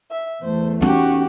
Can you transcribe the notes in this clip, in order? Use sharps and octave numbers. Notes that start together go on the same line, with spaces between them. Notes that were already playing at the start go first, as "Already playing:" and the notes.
E5
E2 A3 C5
C#4 D#4 F#4 G4